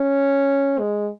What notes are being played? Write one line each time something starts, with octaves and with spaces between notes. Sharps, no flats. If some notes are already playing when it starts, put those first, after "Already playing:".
Already playing: C#4
G#3